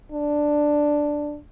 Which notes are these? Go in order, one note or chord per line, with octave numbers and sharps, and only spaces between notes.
D4